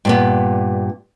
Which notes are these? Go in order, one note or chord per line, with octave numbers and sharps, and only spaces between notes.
G2 A#2 B3